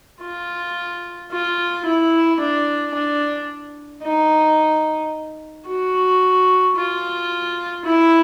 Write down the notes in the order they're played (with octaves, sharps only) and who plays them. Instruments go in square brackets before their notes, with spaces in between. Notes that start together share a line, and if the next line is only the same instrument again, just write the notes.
[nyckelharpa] F4
F4
E4
D4
D4
D#4
F#4
F4
E4